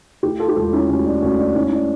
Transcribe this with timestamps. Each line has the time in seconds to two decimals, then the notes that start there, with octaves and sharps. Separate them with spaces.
0.23 D2 E4 G4
0.39 F4 A4
0.49 G4
0.56 E1 F4 A4
0.73 C#4 E4
0.89 D2 C#4
1.06 D4
1.22 D2 C#4
1.39 D4
1.55 D2 C#4 E4
1.67 E4
1.72 D4